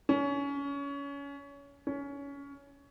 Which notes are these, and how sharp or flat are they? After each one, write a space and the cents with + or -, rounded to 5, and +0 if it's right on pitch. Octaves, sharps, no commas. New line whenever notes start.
C#4 +25
C#4 +20